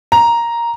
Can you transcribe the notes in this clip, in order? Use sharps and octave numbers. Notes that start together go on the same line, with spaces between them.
A#5